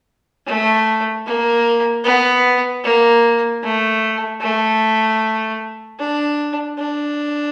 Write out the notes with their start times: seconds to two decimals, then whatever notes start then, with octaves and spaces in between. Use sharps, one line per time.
0.46 A3
1.26 A#3
2.04 B3
2.84 A#3
3.63 A3
4.41 A3
5.99 D4
6.78 D4